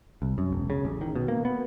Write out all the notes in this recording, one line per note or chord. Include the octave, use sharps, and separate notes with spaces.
C2
F#2
E1
C#3
A1
D#3
B2
A#3
B3